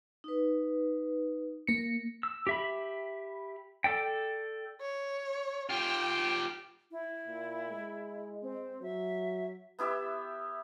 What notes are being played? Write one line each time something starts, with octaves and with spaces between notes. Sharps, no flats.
D#4 B4
A#3 C#7
E6
G4 E5 B5
A4 D5 G5
C#5
F4 G4 G5
E4
A#2
G#3
C4
F#3 E5
B3 E4 G4 E5